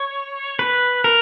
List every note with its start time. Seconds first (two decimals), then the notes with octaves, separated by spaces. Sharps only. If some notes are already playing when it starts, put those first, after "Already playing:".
Already playing: C#5
0.59 B4
1.04 A#4